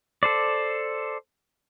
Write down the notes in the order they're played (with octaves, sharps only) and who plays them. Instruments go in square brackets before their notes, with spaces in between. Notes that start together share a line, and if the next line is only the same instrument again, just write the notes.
[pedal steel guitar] A4 C5 D5